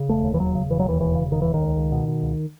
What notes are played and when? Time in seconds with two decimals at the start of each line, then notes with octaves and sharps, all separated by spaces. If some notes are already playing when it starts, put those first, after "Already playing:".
Already playing: C#3
0.09 E1 A3
0.24 D#2
0.34 E3
0.40 E1 F#3
0.55 C#3
0.70 E1 E3
0.80 F#3
0.85 D#2 E3
1.00 E1 E3
1.15 C#3
1.31 E1 D#3
1.42 D#2 E3
1.54 D#3
1.61 C#2
1.77 C#2
1.92 B2
2.08 B2
2.23 C#2